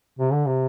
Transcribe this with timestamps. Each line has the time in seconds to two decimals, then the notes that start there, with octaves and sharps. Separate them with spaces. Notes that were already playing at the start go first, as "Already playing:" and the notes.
0.19 C3
0.33 D3
0.47 C3